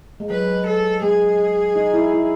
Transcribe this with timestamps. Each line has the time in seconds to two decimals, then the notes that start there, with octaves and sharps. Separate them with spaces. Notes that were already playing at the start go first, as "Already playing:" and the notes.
0.20 G#3
0.30 F#3 B4
0.66 A4
1.02 G#3 G#4
1.76 D#4
1.93 E4
2.12 E4